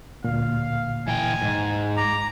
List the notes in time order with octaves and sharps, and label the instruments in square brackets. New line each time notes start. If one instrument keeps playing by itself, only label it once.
[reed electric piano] D2 A#2 [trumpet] F5
[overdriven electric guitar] E3 G5 [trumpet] G#5
[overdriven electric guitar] G#2
[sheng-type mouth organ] A#5 [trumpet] D6